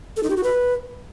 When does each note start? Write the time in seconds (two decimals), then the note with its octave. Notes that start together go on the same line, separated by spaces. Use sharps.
0.17 A4
0.23 D#4
0.30 G4
0.37 F#4
0.44 B4